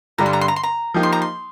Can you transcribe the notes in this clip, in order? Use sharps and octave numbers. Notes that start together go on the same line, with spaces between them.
G2 D3 G3 D4 A#5
C6
A#5
C6
A#5
C6
A#5
F3 A#3 D#4 G4
C6
A#5
C6